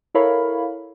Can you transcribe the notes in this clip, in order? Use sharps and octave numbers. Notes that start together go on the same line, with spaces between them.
E4 A4 A#4 C#5 F5 B5